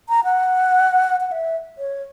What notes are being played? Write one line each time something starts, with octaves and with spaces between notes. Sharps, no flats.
A#5
F#5
F#5
E5
C#5